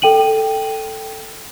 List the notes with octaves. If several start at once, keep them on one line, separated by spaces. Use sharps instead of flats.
A4 G5 D#7 F#7